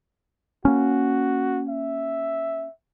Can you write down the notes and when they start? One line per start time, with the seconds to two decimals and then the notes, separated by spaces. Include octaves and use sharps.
0.65 A#3 C#4 F#4
1.69 E5